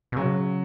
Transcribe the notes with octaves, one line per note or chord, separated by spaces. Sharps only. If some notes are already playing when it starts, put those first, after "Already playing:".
B2
C#3 F#3